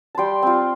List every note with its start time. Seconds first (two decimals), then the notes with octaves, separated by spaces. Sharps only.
0.15 G3 G5 A5 C6
0.43 C4 F4